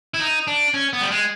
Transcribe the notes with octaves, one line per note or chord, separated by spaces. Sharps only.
E4
D#4
D4
C#4
B3
G3
G#3